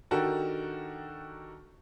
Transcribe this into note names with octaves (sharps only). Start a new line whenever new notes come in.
D#3 D4 F#4 G4 A4 A#4